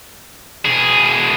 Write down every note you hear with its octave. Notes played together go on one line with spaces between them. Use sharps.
B2 G#4